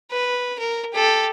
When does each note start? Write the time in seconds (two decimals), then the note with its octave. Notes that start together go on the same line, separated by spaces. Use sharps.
0.11 B4
0.59 A#4
0.94 G4 A4